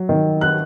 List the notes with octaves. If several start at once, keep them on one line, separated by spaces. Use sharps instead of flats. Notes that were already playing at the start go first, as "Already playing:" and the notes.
Already playing: F#3
D#3
F#6